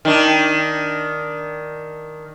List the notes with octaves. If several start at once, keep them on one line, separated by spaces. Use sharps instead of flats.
D#3 D4